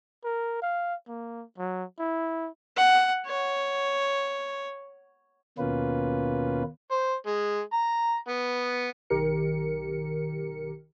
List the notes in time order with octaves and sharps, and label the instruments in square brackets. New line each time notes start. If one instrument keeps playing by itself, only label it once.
[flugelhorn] A#4
F5
A#3
F#3
E4
[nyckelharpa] F#5
C#5
[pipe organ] D#2 B2 A#3 C#4 F4 B4
[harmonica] C5
G#3
A#5
B3
[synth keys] B1 D#3 G4 A#4 C#7